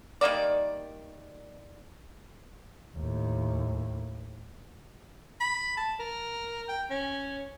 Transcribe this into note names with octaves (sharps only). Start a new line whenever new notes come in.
D#3 G3 A#3 D5
D#2 A2
B5
A5
A#4
G5
C#4